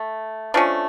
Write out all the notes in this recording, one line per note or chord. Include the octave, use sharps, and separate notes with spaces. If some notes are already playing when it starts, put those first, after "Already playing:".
Already playing: A3
F3 A3 C#4 D4